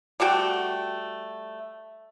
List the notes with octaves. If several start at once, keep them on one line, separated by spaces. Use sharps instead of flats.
G3 A3 F#4 G5